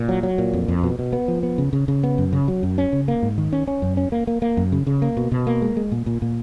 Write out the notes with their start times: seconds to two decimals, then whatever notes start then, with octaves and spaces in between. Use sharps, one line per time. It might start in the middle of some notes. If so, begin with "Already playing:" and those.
Already playing: A#2
0.09 F#3
0.23 F#3
0.38 A#2
0.53 F2
0.68 F2
0.83 B2
0.99 B2
1.13 B3
1.28 F3
1.43 B3
1.58 C#3
1.73 C#3
1.88 C#3
2.03 B3
2.18 F#2
2.33 C#3
2.48 F#3
2.63 F#2
2.78 C#4
2.93 C#3
3.08 A#3
3.22 G#2
3.38 D#3
3.53 C#4
3.68 C#4
3.82 F#2
3.97 C#4
4.12 A#3
4.27 A#3
4.42 A#3
4.57 F#2
4.72 C#3
4.87 C#3
5.02 A#3
5.17 B2
5.32 B2
5.47 A#3
5.62 G#3
5.77 G#3
5.92 A#2
6.06 A#2
6.22 A#2